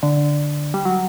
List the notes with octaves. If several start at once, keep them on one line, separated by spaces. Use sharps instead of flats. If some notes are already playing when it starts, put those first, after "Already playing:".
D3
G3
F#3